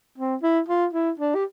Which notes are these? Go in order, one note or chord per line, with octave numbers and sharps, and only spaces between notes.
C4
E4
F4
E4
D4
G4